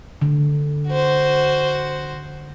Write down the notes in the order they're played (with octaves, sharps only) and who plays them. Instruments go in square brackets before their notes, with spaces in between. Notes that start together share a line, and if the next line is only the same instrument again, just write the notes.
[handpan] D3
[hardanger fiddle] F#4 C5